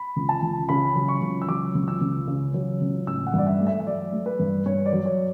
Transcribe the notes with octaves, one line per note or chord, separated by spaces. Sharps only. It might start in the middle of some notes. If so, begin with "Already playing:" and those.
Already playing: B5
C#2
A5
C#2
C#3 B5
F#3
C#6
C#2
E6
F#3 D6
C#2
E6
C#2
C#3
F#3
C#2
A1 E6
F#5
G2 D5
E5
A3
E5
E5
F#3 D5
A3
B4
G2
G2 C#5
D5
F#3
C#5